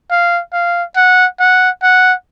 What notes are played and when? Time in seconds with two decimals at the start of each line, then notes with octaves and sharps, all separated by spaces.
0.11 F5
0.53 F5
0.96 F#5
1.39 F#5
1.83 F#5